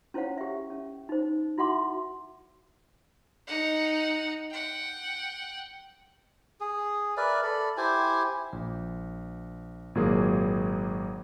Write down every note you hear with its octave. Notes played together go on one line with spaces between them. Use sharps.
C#4 E4 C5 C#5 F5 F#5
G4 E5
C#4
D#4 C5
E4 F#4 E5 F#5 C6 D6
D#4 F#5
F#5 G5
G#4
A#4 B4 D5 E5
A4 D5 B5
E4 G4 C5 G#5
A#1
G#1 A#2 F#3 A#3 G#4